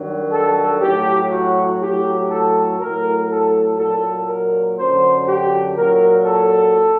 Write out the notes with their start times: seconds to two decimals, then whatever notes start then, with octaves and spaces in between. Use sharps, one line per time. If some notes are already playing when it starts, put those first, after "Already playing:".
Already playing: G2 D#3 F#3
0.32 A4
0.81 A2 F#3 G4
1.31 F#4
1.80 A2 F#3 G4
2.30 A4
2.79 A2 F#3 A#4
3.29 A4
3.78 A#2 F#3 A4
4.28 A#4
4.77 F#2 D3 F#3 C5
5.27 G4
5.77 A#2 F#3 A#4
6.26 A4